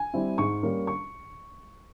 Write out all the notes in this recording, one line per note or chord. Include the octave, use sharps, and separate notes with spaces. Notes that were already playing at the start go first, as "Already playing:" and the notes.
Already playing: G#5
G3 C4 E4
G#2 C#6
G3 A#3 C#4
C#6